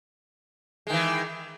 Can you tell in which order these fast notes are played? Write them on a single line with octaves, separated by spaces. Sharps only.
G#3 D#3 E3